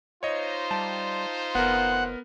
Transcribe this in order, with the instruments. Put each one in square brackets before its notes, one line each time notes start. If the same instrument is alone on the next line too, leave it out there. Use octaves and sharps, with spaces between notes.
[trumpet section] D#4 F4 C5 [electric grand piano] C#5 D#5
[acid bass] G3 [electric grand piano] A5
[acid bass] F1 [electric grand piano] B3 A#4 [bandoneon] F#5